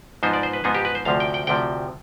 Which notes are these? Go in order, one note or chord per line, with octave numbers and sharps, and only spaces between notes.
G#2 F3 B3 D#4 C5
D5
C5
B4
G#2 F3 B3 D#4 G#4
G4
B4
C5
D2 C3 F3 F5
G5
G5
D2 C3 F3 G5